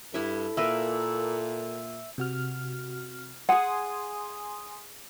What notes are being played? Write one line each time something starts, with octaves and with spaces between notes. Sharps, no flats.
G2 E4 A4 E5
A#2 A#3 A#4 B4 E5
C3 F#4 F6
G#4 F#5 G#5 C6 D#6